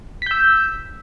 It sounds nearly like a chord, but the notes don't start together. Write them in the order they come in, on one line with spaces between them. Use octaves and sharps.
B6 G6 E6